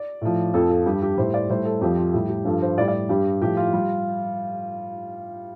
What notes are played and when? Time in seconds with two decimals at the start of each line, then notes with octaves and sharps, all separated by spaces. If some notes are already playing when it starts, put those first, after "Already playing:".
Already playing: D5
0.21 A2 F3
0.54 F2 F3 A4
0.70 A4
0.86 G2 G3 G4
1.02 G4
1.17 A2 G3 C5
1.34 D5
1.49 A2 G3 C5
1.65 A4
1.81 F2 F3 G4
1.97 F4
2.13 A2 G3 G4
2.29 G4
2.45 G2 F3 A4
2.62 C5
2.78 A2 D5
2.81 G3
2.88 D5
3.09 G2 G3 G4
3.41 A2 F3 G4
3.57 F4
3.73 G3